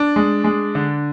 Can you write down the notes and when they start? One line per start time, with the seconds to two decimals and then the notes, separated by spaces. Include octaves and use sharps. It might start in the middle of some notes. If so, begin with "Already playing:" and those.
Already playing: D4
0.16 G#3
0.44 G#3
0.75 D3